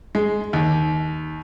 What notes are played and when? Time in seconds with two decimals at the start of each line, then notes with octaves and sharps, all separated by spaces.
0.15 G#3
0.53 D#2